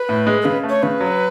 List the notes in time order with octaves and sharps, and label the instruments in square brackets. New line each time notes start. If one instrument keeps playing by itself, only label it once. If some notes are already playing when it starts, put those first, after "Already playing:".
Already playing: [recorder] B4
[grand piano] A2
G#3
[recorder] A4
[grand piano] C#3 [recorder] B4
[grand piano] A3
[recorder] C#5
[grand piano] C#3 [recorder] B4
[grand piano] F#3